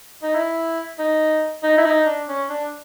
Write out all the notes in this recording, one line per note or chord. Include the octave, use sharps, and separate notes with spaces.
D#4
E4
D#4
D#4
E4
D#4
D4
C#4
D4